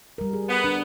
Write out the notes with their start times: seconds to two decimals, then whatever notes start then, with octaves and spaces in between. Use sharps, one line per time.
0.18 G3 A#4
0.33 G#4
0.49 B3
0.64 D4